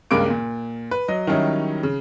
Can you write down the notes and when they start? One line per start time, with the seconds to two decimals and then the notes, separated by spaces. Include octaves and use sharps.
0.11 C#2 G2 C#3 A#3 D6 D7
0.30 A#2
0.91 B4
1.08 F#3 D#5
1.27 D#3 F#3 G3 C#4 D#4 E4
1.83 C#3